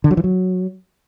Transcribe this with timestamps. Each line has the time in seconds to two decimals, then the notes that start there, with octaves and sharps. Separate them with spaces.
0.04 D3
0.11 F#3
0.17 E3
0.24 F#3